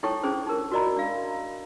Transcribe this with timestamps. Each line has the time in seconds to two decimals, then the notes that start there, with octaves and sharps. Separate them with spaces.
0.03 D#4 E4 A4 C#5 G5 C#6
0.23 C#4 D4 G#4 C5
0.47 D#4 A#4
0.72 F#4 A#4 D5 D#5 A#5 B5
0.96 D4 F5